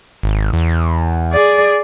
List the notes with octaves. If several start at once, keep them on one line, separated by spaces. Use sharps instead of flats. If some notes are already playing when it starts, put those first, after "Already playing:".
G#1
E2
G#4 D5